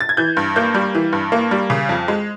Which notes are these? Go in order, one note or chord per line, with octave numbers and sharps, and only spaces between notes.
A6
G#6
E3 G6
G2
A#3 G6
G3
E3
G2
A#3
G3
C#3
F2
G#3